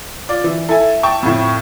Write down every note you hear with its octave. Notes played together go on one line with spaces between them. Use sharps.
F4 D5
E3
E4 A4 G#5
G5 A5 C#6
F2 A2